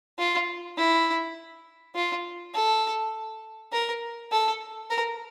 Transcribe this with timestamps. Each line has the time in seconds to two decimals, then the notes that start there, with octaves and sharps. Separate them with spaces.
0.19 F4
0.77 E4
1.95 F4
2.54 A4
3.72 A#4
4.32 A4
4.90 A#4